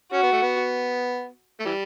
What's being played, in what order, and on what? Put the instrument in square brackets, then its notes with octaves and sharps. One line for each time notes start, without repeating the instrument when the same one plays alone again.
[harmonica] C#4 [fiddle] F#4
[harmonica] B3
A3
B3
A3
E3 G3